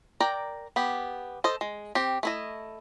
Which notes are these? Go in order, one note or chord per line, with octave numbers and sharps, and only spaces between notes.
A#4 D5 G5 A#5
B3 G4
A4 C5 D#5
G#3
C4 G4
A3 E4 D#5